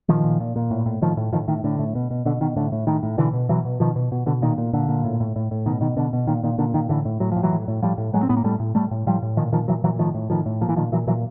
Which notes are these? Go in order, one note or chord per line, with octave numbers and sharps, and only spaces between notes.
A#2 D#3 F3
A#2
A#2
A#2
A2
A2
A2 D#3 F3
A2
A2 D#3 F3
A2 D#3
A2 D3
A2
B2
B2
B2 D3
B2 D#3
A2 D3
A2
A2 D#3
A2
B2 D3 E3
B2
B2 E3 F#3
B2
B2 D#3 F3
B2
B2
B2 D3
A#2 D#3
A#2
A#2 D3
A#2
A2
A2
A2
A2
B2 D#3
B2 D#3
B2 D3
B2
A#2 D#3
A#2 D#3
A#2 D3
A#2 D#3
A2 D3 E3
A2
A2 F#3
A2 F3
E3 F#3
A2
A2
A2 F3 G3
A2
A2 F#3 G#3
C4
A2 B3
A#3
A2 G3 A3
A2
A2 G3 A3
A2
A2 F3 G3
A2
A#2 D#3 F3
A#2 D#3 F3
A#2 E3 F#3
A#2 E3 F#3
A2 D#3 F3
A2
A2 D#3 F3
A2
A#2 F3
E3
A#2 D#3 F3
A#2 E3 F#3
A#2 E3 F#3